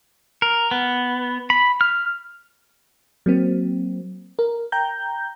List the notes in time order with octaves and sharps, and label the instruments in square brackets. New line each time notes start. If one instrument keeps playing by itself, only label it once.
[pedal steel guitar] A#4
B3
B5
F6
[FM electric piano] F#3 A#3 C4
A#4
G5 A#5 G6